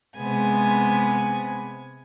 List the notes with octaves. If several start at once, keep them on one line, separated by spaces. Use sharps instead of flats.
C3 G#3 B3 G#5